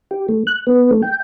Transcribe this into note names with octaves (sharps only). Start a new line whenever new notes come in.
G4
A3
F#6
B3
A3
G5